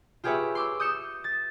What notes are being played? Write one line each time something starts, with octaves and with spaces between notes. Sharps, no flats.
F4 G4 G#4 B4 C#5 E5
C6 D6 E6
D#6 G6 C#7 E7
A6